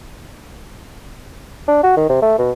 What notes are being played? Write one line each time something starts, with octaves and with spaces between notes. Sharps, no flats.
D4
F#4
D#3
C3
A3
B2